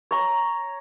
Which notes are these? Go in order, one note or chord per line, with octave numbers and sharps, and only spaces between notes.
C#5 A#5